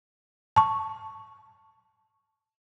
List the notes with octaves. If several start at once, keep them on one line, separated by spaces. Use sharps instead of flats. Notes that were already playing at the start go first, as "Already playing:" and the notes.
A5 C#6